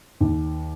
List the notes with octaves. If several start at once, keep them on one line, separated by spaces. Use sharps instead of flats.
D#2